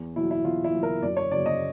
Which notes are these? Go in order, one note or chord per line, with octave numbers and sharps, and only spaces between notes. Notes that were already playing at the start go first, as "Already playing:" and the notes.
Already playing: E2
B2 F#3 E4
E4
E2 F4
E4
B2 F#3
A#4
F#2 D5
C#5
C#3 F#3 D5
D#5